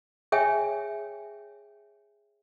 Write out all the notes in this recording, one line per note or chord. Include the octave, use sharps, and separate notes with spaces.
G#4 C#5 E5 G5 G#5